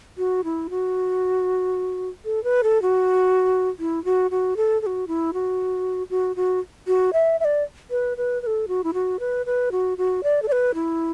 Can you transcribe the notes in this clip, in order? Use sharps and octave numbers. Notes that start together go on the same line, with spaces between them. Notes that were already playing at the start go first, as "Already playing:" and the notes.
F#4
E4
F#4
A4
B4
A4
F#4
E4
F#4
F#4
A4
A4
F#4
E4
F#4
F#4
F#4
F#4
E5
E5
D5
B4
B4
B4
A4
F#4
E4
F#4
B4
B4
F#4
F#4
D5
A4
D5
B4
E4